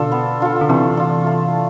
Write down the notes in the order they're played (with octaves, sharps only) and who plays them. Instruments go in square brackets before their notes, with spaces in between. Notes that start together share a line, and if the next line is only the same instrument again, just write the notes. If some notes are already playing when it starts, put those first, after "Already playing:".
Already playing: [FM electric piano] B2 D3 [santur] D4 F4 A4
[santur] B3
D4 F4 A4
[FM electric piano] D3
[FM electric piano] C3 E3 [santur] A3
[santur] D4 F4
A3